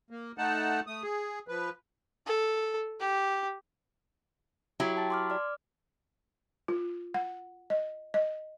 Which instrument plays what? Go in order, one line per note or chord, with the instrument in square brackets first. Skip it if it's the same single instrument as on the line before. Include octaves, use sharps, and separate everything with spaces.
[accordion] A#3
A3 D#4 F#5 A5
A3 D#6
G#4
F3 B4
[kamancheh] A4
G4
[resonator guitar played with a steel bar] F#3 E4 G4
[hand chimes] A5 A6
C6 D6 F6
D5 D6 F6
[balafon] F4
F#5
D#5
D#5